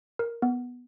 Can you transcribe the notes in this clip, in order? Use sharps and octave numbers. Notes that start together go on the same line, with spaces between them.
A#4
B3